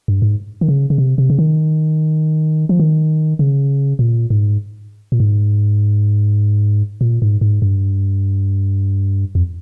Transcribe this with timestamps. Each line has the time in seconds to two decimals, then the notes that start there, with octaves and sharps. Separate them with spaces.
0.08 G2
0.22 G#2
0.61 D#3
0.69 C#3
0.90 C#3
0.98 C3
1.18 C3
1.30 C#3
1.39 D#3
2.69 F3
2.80 D#3
3.39 C#3
3.99 A#2
4.30 G#2
5.12 A#2
5.20 G#2
7.01 A#2
7.22 G#2
7.41 G#2
7.62 G2
9.35 F2